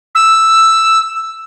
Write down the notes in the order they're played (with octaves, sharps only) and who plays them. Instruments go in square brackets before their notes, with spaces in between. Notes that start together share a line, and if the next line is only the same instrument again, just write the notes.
[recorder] E6